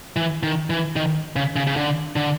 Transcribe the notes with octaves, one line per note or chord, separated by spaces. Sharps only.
E3
D#3
E3
D#3
C#3
C#3
C#3
D3
D3